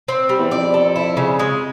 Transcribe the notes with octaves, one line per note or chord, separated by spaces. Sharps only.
C4
G3
E2
F2 D5
A4
E4
C#3
G#3